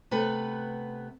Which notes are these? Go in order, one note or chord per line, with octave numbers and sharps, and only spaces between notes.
C3 A3 B3 B4